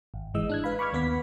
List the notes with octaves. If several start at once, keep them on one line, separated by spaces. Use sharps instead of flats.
G#1
G1 G#2 E3 G#3 D#5 E6
D4 F#6 G#6
B4 F5 B5
B5 C#6 D6 F6 G#6
D#2 B3 B4 F#5 B6